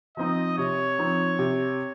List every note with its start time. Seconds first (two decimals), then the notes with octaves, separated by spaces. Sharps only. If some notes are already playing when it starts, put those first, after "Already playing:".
0.17 F3 C4 D#4 D#5
0.58 C3 C#5
0.98 F3 C4 D#4
1.39 C3